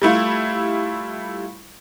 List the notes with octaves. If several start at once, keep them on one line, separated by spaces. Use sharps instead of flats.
G3 A3 E4 F4